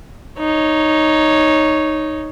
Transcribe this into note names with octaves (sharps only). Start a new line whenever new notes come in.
D#4 C#5